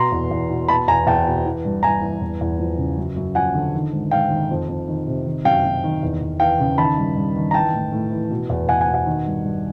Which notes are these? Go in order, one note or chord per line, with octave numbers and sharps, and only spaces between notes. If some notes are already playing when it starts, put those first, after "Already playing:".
Already playing: B2 A#5 C6
E2
E2
B2
B2 A5 B5
E2 G#5 A#5
E2 G5 A5
B2
E3
G2
G2 G#5 A#5
E3
E2
E2
F3
C#3
F#2
F#2
F3 F#5 G#5
D3
D#3
G#2
G#2 F5 G5
D#3
F2
F2
D#3
C3
D#3
F#2 F5 G5
F#2
D#3
E2
E2
E3 F5 G5
C#3
D#3 A5 B5
G2
G2
D#3
A#5
E3 G5 A5
A2
A2
E3
B2
E2
E2 F#5 G#5
F#5 G#5
B2
F#5 G#5
D#3
G2
G2